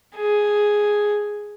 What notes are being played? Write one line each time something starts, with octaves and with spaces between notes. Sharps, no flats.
G#4